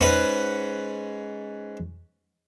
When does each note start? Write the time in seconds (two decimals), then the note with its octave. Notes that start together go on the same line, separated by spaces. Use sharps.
0.01 G#2 C#4 B4 F#5 C#6